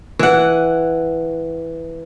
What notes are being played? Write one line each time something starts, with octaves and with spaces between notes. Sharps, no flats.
E3 F#5